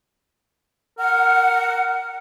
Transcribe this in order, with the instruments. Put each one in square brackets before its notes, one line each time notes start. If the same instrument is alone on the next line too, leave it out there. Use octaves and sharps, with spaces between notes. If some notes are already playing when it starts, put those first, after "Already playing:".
[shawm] A#4 [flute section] F#5